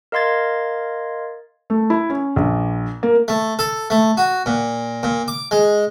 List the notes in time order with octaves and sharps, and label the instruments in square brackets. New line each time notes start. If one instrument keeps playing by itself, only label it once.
[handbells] A#4 D#5 F5 C6 G#6 A6
[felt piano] A3
E4
C#4
A#1
A#3
[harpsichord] A3
A4
A3
F#4
A#2
A#2
D6
G#3